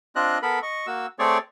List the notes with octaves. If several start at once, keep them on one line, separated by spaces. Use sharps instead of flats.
C4 D4 F4 D#5 F#6
B3 A4 A#4 B5
D#5 C#6
A#3 F#4 E6
A3 C4 G#4 C#5 D5